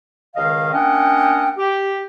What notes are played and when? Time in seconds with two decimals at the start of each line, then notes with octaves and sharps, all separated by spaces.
0.36 C#2 D#3 D#5 F5
0.73 A#3 C#4 D4 D#5 F#5 G5
1.57 G4